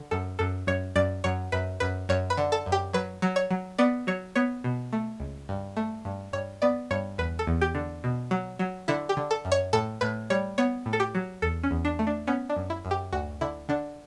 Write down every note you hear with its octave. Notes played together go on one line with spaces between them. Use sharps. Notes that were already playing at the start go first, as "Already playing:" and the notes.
Already playing: D3
F#2 A4
F#2 A4
F#2 C#5
F#2 D5
F#2 C#5
F#2 B4
F#2 B4
F#2 C#5
B4
D3
A4
F#2
G4
F#3 B4
F#3
C#5
F#3
B3 D5
F#3 C#5
B3 C#5
B2
A3
C#2
G2
A3
G2
G2 C#5
B3 D5
G2 C#5
E2 B4
A4
E2
G4
D3
B2
F#3
F#3
D3 E4
G4
D3
A4
F#2
C#5
A2 A4
A2 B4
G3 C#5
B3 C#5
A2
A4
G4
F#3
E2 A4
C#4
E2
D4
A3
D4
B3 C#4
D4
F#2
E4
F#2
G4
D2 F#4
D3 E4
D3 D4